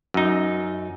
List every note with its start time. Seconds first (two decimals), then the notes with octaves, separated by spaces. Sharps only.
0.14 F#2 D#4